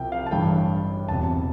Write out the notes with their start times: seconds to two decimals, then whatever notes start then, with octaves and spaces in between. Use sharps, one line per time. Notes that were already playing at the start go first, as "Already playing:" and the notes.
Already playing: C2 C3 F3 G5
0.12 F5
0.26 A5
0.31 A1 G2 E3 G3 G5
1.08 E1 E2 C3 A5